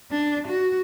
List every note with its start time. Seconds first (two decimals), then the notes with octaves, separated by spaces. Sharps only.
0.11 D4
0.47 F#4